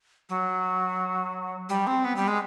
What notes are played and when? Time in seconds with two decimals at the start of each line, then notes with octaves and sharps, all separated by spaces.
0.29 F#3
1.69 G3
1.87 C4
2.04 B3
2.16 G3
2.28 G#3